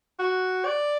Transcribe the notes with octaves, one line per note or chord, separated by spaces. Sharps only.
F#4
D5